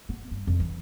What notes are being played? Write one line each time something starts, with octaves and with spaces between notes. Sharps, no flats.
B3
G2
F2
E3